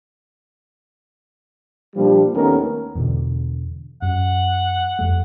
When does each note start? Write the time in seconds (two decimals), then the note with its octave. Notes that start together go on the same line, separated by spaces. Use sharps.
1.95 A#2 F3 G3 A#3 D4
2.34 D#2 A3 B3 C#4 A#4
2.95 E2 B2 D3
4.02 F#2 F#5
4.99 F2 A3